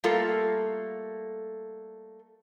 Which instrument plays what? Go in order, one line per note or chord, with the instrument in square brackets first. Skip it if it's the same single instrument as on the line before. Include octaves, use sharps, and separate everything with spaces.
[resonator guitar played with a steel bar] G3 A3 A#3 F4 A4